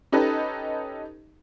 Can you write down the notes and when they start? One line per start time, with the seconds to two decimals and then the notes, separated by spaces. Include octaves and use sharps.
0.12 C#4 D#4 G4 A4 B4 D#5